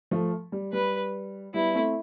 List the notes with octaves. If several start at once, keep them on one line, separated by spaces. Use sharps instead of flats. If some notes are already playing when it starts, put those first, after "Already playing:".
F3 A3
G3
G3 B4
G3 B3 E4
A3 C4